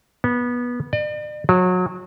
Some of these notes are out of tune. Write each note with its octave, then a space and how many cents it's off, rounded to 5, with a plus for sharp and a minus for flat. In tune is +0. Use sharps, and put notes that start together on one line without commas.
B3 -20
D5 +40
F#3 -25